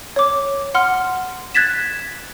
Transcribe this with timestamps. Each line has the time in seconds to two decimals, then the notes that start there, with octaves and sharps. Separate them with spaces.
0.16 C#5 D6
0.74 F#5 C6 F6
1.55 F#6 G#6 A6 B6 E7